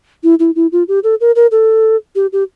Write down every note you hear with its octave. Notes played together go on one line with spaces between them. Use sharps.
E4
E4
E4
F4
G4
A4
A#4
A#4
A4
G4
G4